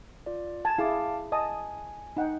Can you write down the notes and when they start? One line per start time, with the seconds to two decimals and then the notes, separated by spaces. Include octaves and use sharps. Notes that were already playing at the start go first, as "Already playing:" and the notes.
0.26 F4 D5
0.65 G#5 A5
0.78 E4 G#4 F5 A5 D6
1.32 D#5 G#5 A5 D#6
2.17 D#4 F#5 G5